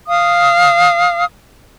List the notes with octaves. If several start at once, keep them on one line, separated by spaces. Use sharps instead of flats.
F5 D#6